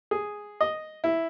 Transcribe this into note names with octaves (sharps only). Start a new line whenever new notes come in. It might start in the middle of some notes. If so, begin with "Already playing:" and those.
G#4
D#5
E4